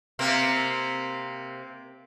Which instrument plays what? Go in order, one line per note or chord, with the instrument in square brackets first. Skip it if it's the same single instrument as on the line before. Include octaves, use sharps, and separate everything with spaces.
[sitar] C3 A#3 C4